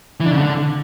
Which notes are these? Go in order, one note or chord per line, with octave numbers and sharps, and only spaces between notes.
E3
D4
C#3
D3